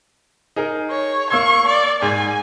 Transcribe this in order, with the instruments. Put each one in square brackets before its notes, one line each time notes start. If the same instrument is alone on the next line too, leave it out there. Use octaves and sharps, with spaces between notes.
[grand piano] D#4 G#4 A#4
[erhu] C#5
[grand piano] A#3 E6 G#6 [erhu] C#6
[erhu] D5
[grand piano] G#2 [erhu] G#5